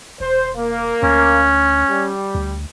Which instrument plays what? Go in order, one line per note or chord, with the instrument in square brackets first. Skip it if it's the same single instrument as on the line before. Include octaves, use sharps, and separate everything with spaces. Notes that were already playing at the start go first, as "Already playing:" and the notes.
[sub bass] E1 [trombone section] C5
[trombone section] A#3
[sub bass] D2 [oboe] C#4
[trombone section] G3
[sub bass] D2